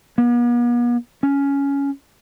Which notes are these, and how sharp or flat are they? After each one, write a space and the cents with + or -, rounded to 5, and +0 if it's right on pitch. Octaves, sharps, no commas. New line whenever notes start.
B3 -45
C#4 +10